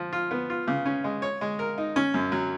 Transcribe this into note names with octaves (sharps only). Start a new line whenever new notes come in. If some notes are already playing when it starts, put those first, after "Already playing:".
Already playing: F3
F4
B3
F4
C#3
C#4
G#3
C#5
G#3
A#4
D#4
C#4
F#2
F#3